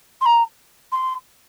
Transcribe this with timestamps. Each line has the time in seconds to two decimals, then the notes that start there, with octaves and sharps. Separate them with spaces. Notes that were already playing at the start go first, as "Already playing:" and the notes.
0.21 C6
0.26 A#5
0.92 C6